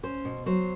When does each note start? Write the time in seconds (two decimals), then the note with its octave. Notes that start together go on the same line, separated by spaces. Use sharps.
0.03 C#4 C5
0.25 B2
0.46 F#3 C5